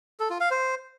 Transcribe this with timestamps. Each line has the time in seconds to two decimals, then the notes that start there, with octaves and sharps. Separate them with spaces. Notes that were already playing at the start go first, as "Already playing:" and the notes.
0.20 A4
0.30 F4
0.40 F5
0.51 C5